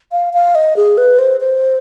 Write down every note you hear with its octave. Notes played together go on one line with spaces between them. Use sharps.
F5
F5
D#5
G#4
B4
C5
C5